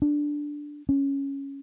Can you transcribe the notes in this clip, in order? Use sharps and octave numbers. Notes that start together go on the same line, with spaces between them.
D4
C#4